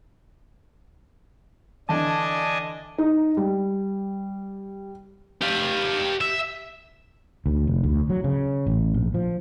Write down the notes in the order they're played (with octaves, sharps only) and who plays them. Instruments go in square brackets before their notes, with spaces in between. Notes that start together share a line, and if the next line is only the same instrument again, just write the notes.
[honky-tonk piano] D3 E3 A5 [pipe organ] D4 D#5 G#5
[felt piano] D#4
G3
[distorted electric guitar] G4 F5
E5
[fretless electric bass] D2
F1
D2
F#3
C#3
A1
A#1
F3